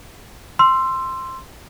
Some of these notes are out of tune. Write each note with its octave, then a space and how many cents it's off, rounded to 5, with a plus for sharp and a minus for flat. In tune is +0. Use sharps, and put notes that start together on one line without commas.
C6 +0 E6 +20